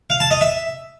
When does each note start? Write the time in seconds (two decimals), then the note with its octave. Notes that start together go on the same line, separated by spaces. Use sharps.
0.10 F5
0.20 A5
0.31 D#5
0.41 E5